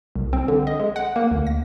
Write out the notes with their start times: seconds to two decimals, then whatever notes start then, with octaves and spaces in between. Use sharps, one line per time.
0.16 C2
0.33 C4
0.48 D3
0.67 D#5
0.80 G#3
0.96 F#5
1.16 A#3
1.31 D2
1.47 A#6